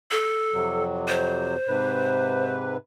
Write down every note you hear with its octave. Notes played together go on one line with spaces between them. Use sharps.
A4
F2 C3 F#3
C5
G#2 C3 B4